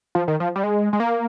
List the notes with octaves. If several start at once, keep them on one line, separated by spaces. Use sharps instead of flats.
F3
D#3
F3
G3
G#3
G#3
A#3